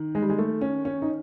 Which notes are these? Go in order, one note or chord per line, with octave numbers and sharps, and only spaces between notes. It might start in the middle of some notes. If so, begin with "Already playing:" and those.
Already playing: D#3
G#3
G3
G#3
A3
C#4
C#4
D#4